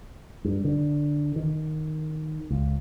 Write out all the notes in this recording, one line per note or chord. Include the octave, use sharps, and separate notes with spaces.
G2
D3
D#3
C#2